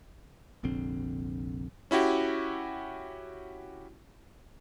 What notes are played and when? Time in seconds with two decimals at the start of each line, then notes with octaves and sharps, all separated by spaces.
0.63 F1 A#1 D3 C4
1.91 C#4 E4 F#4 G4